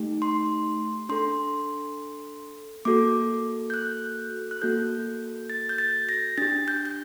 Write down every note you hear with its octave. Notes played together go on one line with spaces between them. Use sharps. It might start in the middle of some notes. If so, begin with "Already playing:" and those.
Already playing: A3 D#4 G4
C6
D4 A4 C6
A#3 F#4 A4 D6
G6
F#6
F#6
A#3 F#4 A4 G6
A6
G6
A6
A#6
D4 G4 A6
G6
G6